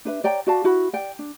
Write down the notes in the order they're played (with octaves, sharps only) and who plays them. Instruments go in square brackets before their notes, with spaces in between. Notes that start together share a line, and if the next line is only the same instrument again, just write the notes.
[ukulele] D4 B4 E5
C#5 D5 G5 A#5
F#4 D5 F5 A5
E4 F#4 B5
D5 G5
D4